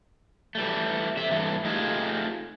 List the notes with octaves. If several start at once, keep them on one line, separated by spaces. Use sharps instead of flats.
E3 G3 A3
C3 E5
G2 E3 A3
A3 D#4 F4 G4 G#4